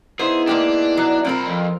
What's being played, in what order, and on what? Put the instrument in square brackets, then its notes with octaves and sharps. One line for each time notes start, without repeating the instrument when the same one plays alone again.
[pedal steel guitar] B3 D#4 E4 [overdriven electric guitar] G#4 [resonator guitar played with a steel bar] C5
[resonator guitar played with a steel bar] G#3 A#3 G4 [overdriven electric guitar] D4
[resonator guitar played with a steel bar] F#3
[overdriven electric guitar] C2 B5 [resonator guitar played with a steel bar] C4 F4 A#4
[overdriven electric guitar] F2